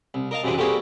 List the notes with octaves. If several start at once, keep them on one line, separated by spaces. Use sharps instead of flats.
C2
A#4 D#5 F5 A5
F#2 C3 E3 G#3 D4
G3 A3 A#3 C4 F#4 G#4